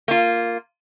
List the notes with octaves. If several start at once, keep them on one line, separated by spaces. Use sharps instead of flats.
A#3 F4